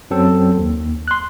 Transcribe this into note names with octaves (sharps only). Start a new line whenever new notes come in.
F#2 F#3 C4 A4 G5
D#2
C6 F#6